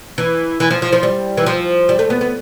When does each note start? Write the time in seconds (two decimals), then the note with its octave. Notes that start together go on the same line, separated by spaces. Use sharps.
0.18 E3
0.60 E3
0.71 F3
0.82 F3
0.92 F3
1.03 G3
1.37 E3
1.46 F3
1.89 G3
1.99 A3
2.10 B3
2.21 B3